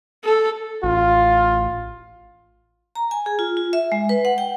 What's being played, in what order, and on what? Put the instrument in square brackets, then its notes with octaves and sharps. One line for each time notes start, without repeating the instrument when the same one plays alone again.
[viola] A4
[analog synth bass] A1 [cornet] F4
[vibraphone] A#5
G#5
G#4
F4
F4
E5
G#3
B4
F#5
G5